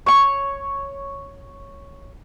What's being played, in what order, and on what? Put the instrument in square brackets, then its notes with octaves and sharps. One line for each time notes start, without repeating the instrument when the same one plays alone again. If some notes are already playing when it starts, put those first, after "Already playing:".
[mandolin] C#5 C#6